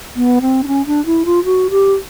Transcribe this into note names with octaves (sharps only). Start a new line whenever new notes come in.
B3
C4
D4
C#4
D4
E4
F4
F#4
G4